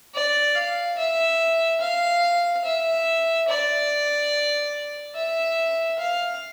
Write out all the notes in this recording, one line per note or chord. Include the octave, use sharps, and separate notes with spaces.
D5
F5
E5
F5
E5
D5
E5
F5